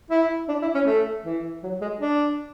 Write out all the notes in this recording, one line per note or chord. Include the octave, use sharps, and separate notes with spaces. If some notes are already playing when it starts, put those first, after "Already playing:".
E4
D4
E4
C#4
A3
E3
F#3
G#3
D4